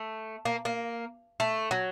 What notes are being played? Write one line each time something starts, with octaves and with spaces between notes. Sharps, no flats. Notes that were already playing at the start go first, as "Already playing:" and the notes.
Already playing: A3
A#3
A#3
A3
F#3